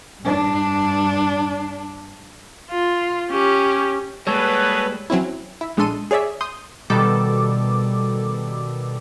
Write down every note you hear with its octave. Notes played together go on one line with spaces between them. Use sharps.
G2 D4
F4
C#4 G4
B2 G3 G#3 A#3 G#4 A4 B4 C#5
F#3 C4 C#4 E4
E4
A#1 G#3 D4 A4 C6 D#7
G#4 C#5 D5 E5
C6 D#6 G6
B2 D#3 G3 A4 D6